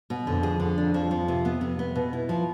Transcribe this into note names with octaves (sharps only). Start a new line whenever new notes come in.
B2
F2 D3
G#4
D3
D4
F3
F3
C3
B3
C3
B3
B2
E4
F3